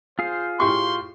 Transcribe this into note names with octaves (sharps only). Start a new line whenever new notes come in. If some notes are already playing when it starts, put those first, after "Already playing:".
F4 G#4 C5 F5
A2 G4 C6 C#6